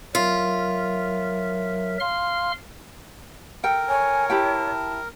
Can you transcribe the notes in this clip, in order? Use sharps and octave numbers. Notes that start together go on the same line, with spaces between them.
F#3 F4 A#4 E5
F5 C6 F6
A4 A#4 G5
C#5 G#5
E4 G4 G5 A5